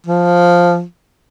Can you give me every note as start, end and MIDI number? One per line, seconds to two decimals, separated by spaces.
0.07 0.84 53